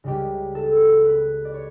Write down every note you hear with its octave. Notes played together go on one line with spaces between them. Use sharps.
C#2 C#3 G3 G4
A4
B4
D5
C#5